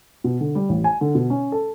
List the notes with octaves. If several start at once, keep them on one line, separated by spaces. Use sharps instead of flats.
B2
D3
G3
A1
G#5
D3
B2
C#4
A4